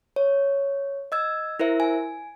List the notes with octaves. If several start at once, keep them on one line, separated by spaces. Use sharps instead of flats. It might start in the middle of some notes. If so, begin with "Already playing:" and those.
C#5
D#5 E6 G#6
E4 A#4 C5 E5
G#5